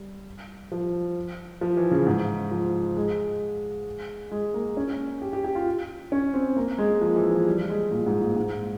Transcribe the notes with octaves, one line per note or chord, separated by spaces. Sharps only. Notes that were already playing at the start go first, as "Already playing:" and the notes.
Already playing: G3
F3
F3
E3
C#3
G#2
F3
G#3
G#3
A#3
C#4
G4
G4
G4
F4
C#4
C4
A#3
G#3
F3
E3
F3
G3
G#3
A#2
G#2
A#2
G#2